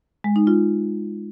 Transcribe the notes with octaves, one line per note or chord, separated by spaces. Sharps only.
G#3
D#4
F4